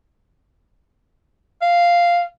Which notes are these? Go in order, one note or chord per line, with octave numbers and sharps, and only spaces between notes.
F5